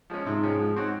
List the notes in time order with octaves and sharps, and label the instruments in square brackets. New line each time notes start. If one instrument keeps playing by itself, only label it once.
[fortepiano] F3 G#3 C#4
[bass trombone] G#2 [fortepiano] C3
[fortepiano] F3 G#3 C#4
F3
C4 F#4 C#5